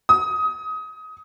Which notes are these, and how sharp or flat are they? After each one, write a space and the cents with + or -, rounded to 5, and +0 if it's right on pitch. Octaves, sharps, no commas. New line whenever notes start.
D#6 +20